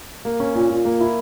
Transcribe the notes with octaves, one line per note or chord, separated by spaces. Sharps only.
A#3
C#4
A#2
A#2
A#3
E4